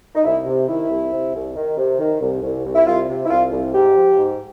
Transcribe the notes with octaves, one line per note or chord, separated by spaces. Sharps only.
D#4
C2 E4
C3
D#3 E4
C2
C3
C2
D#3
C3
D#3
C2
C2
C2
E4
C2 F4
C3
E4
C2 F4
C2
G#2 G4
F3
G#2